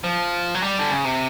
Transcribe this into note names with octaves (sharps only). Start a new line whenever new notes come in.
F3
F#3
G3
D3
C#3
C3